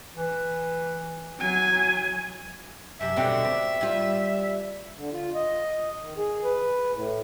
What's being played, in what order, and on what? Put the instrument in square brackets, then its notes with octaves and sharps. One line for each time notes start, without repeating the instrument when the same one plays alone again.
[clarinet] E3
[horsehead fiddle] F#3 G#5
[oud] F#2 C3 [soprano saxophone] E5
[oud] B2 D3 C4
C4
G3 F4
[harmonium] D3
F4
D#5
D#3
G#4
B4
A2